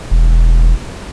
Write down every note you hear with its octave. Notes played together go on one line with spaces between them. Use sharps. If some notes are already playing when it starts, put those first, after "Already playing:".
E1